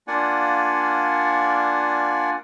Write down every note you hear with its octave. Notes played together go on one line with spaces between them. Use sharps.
A#3 D4 F4 D5 F#5 G#5